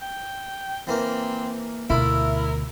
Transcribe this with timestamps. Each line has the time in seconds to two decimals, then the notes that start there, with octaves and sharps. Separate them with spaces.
0.02 G5
0.87 E3 A#3 C4 A#4
1.90 D2 B2 E4 F4 A#4